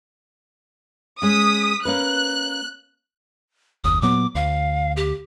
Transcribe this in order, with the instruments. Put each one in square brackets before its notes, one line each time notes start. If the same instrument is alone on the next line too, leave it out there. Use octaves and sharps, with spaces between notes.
[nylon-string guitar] G#3 C#4 [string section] D#6 B6
[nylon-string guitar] A#3 C#4 B4 [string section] F#6
[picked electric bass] F#1 D#2 [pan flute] D#6
[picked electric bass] A#2 F#3 B3 [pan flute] D6
[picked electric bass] D2 [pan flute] F5
[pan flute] G4